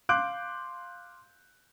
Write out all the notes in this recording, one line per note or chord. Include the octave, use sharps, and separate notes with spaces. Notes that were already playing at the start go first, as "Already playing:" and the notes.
F5 C6 D6 F#6 G6 D7